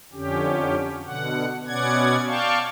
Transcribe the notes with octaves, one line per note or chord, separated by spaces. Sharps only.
F2 D3 C#4 G4
B2 D3 F#5
B2 B3 C#4 D5 F#5 G#6
D5 F5 G5 A5 C#6